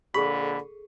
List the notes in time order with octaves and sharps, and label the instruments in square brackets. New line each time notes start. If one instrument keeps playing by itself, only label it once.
[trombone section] F2 A#2 D3 [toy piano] G#4 A4 C#6 [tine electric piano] B5